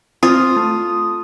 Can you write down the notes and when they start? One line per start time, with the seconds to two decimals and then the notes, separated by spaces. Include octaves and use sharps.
0.23 C4 F4 D#6
0.56 A3